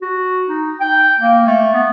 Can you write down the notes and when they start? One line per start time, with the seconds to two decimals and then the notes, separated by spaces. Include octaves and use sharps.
0.02 F#4
0.48 D#4
0.81 G5
1.20 A#3
1.47 A3
1.74 B3